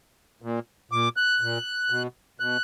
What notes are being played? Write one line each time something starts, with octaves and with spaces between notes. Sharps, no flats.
A#2
A#2 D6
F#6
A#2
B2
B2 F#6